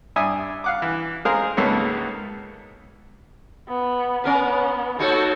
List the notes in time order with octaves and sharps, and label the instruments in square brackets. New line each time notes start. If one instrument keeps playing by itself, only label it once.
[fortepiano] G2 E5 G#5 D#6
F5 F#5 D6
E3
G#3 G#4 A#4 C5 F5
C#2 G#2 A#3 B3 A4 C#5
[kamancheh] B3
[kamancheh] B3 [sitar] C#4 A#4 B4
[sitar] A#3 D#4 F#4 [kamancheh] A4 C#5